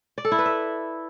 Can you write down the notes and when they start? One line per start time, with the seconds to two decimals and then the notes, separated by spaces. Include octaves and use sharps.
0.18 D5
0.25 A4
0.32 E4
0.39 B4
0.46 E5